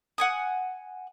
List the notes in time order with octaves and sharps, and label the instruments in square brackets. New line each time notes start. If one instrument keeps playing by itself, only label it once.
[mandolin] F#5 G#5 D#6